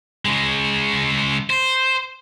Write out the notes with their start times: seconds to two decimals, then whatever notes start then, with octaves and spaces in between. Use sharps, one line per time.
0.25 C#3 G#3
1.50 C5